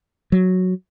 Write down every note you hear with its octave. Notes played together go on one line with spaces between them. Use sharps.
F#3